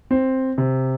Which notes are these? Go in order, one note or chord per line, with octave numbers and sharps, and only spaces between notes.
C4
C3